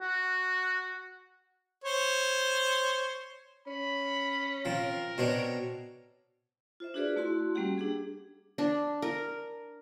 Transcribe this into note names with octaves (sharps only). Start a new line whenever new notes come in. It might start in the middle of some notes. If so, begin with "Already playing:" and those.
F#4
C5 C#5
C#4 B5
F3 C4 A#4
B2 C4 D4 C#5
F4 C5 E5
D4 F4 F#4 G#4 B4 D5
A3 E4 F#4 A5 C6
G3 A#3 C#4 G4 F#5
D4 G4 G#4
D4
A#4